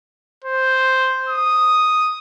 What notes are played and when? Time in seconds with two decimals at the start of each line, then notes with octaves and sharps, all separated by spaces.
0.44 C5
1.28 D#6